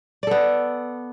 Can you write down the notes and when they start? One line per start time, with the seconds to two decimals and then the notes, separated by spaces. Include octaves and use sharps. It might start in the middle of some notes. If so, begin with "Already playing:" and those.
0.23 D5
0.27 A4
0.31 B3